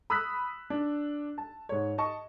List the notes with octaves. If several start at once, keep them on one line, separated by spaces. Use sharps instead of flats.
B5 D#6 E6 F#6 B6
D4
A5
G#2 C#5
D#5 A5 C#6